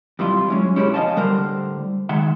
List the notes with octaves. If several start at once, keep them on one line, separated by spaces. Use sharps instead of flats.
F2 G3 E4 F4
F#3 G#3 C#4
C#4 E4 G4 G#4 A#4 B4
F3 B3 D#5 F5 G#5 A5
A2 D3 G3 A#4 C5
D#3 G#3 E5 F#5